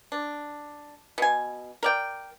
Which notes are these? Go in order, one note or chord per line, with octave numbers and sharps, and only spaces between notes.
D4
B2 G#5
A#4 D5 G5